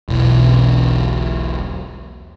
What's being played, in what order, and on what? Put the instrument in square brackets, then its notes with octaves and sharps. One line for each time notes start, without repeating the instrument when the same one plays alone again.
[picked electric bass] E1 B1